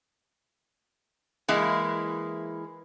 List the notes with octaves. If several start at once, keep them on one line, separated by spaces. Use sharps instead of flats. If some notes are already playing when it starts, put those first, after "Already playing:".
E3 G#3 A#3 E4